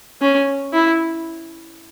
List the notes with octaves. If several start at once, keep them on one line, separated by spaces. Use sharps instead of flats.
C#4
E4